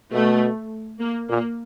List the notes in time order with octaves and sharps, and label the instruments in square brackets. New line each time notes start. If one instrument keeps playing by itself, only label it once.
[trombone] B2 [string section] A3
[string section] A#3
[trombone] A#2 [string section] A#3